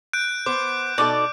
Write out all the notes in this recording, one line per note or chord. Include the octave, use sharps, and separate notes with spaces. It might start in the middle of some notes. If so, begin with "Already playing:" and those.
F#6 G6 D7
B3 C5 D6
B2 D#4 A4 D5